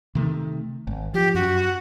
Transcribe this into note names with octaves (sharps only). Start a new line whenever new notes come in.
C3 D#3 A3
G#1
F3 G4
F#2 F#4